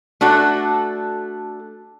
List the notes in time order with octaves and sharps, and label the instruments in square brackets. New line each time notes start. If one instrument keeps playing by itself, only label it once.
[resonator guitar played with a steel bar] A3 D4 F#4 A4